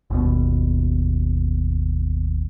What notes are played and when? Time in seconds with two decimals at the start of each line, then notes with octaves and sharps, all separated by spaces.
0.10 G1 D#2 B2